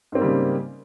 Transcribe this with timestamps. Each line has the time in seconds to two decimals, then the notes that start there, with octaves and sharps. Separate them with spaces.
0.12 G#2
0.15 C4
0.18 A#3
0.21 G3
0.24 C#3